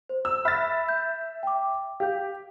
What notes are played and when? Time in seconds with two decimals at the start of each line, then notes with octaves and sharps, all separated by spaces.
0.09 C5
0.25 E6
0.45 E5 B5 F6 F#6 A6
0.89 G6
1.43 G5 D6
2.00 G4 F5 G6